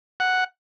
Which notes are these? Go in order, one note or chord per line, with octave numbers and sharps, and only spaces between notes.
F#5